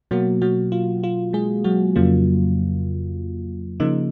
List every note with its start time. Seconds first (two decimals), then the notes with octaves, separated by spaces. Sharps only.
0.11 B2 F#3 A#3 F#4
0.42 F#3 F#4
0.72 F4
1.03 F4
1.33 G#3 G#4
1.64 F#3 F#4
1.96 F2 C#3 F#3 A#3 F4
3.80 C#3 F3 A#3 D#4